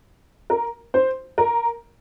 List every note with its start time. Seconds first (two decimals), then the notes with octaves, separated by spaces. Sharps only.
0.50 A#4
0.94 C5
1.38 A#4